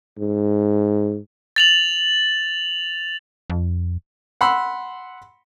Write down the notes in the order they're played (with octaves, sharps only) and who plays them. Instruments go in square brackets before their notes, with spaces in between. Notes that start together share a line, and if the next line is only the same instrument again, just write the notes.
[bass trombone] G#2
[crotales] A6 F7 F#7
[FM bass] F2
[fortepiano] F#5 B5 C6 E6